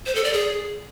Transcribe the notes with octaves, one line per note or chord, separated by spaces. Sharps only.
C5
A4
D5
G#4